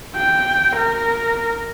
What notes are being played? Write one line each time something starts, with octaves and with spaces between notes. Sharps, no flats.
G5
A#4